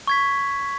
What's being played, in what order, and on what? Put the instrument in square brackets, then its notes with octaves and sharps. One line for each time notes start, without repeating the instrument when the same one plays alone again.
[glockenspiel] C#6 G#6 B6